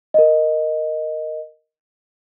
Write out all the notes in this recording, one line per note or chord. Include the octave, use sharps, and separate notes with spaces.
A#4 D#5